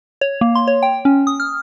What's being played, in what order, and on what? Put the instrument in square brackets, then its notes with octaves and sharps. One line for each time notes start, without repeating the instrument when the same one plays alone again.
[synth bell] C#5
A#3
C6
C#5
G5
C#4
D#6
F6